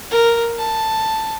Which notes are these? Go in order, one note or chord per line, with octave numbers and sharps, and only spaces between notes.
A#4
A5